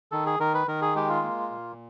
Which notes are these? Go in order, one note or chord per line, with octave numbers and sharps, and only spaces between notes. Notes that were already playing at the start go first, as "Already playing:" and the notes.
D#3 A4
G#4
D#3 A#4
B4
D#3 A#4
G#4
G#3 G4
F4
A#3
A#2